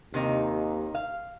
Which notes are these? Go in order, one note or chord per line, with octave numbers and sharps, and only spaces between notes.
D#2 C3 D#3 D#4
F5